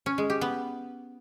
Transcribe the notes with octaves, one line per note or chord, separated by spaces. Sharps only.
C#4
G#3
G4
B3